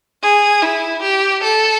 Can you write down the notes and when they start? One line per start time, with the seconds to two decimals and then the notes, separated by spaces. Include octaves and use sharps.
0.23 G#4
0.62 E4
1.03 G4
1.43 A4